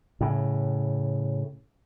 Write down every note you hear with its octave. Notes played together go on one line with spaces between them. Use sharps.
A2 C#3